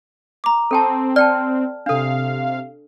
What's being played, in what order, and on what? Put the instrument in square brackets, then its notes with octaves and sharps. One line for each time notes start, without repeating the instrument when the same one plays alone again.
[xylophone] A#5 D6
[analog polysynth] C4 [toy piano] A4 G5 A5
[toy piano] D5 G5 A5 [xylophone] F6
[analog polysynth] C3 F5 [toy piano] D4 A4